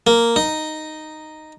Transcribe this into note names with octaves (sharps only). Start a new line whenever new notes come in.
A#3
D#4